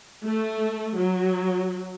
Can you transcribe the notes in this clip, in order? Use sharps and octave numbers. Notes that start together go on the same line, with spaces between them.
A3
F#3